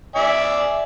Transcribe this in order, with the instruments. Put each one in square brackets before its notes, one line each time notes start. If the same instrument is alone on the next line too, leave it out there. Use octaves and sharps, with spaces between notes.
[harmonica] D5 E5 G#5